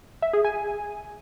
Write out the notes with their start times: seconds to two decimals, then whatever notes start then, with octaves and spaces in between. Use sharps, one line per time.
0.22 E5
0.33 G#4
0.44 G#5